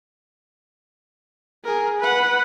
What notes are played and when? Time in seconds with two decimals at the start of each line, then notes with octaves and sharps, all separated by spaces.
1.64 G#4 A#4
1.99 B4 F#5